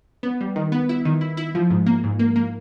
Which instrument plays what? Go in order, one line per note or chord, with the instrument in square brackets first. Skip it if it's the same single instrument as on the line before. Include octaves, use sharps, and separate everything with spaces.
[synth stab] B3
G3
D#3
B3
E4
D#3
E4
E4
F3
G#2
A#3
G#2
A#3
A#3